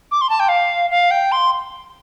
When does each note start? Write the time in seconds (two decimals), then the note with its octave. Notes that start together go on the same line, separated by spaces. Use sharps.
0.11 D6
0.21 C6
0.30 A5
0.40 G5
0.49 F5
0.91 F5
1.11 G5
1.32 C6